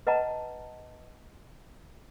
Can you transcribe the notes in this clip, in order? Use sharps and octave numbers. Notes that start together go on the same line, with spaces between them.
B4 D#5 F#5 A5 A#5